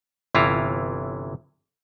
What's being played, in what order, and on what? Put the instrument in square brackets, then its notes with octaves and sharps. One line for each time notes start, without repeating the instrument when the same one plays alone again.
[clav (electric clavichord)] G1 C3 E3 E4 F4 A#5